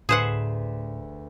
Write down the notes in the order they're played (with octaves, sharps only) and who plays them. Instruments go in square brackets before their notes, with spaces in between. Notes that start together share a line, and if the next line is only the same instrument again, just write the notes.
[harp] D2 B4 E7 [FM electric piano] A2 [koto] G#4 C5 F#5